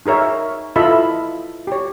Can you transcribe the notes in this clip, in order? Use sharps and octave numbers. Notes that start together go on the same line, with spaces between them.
D#4 G#4 A#4 C#5 E5
E4 F4 A4 D#5 E5 B5
G4 C#5